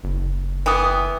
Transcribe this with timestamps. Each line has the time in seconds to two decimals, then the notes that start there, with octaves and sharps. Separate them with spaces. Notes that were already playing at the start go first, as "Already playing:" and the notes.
0.04 F#1
0.66 E3 B3 G5 D#6